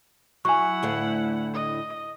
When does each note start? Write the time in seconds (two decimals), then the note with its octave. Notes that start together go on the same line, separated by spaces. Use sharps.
0.45 F#3 E4 F#5 G#5 C#6
0.83 D2 A2 F5
1.53 D#5